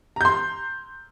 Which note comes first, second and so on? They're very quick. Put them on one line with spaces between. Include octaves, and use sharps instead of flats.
A#5 G6 C6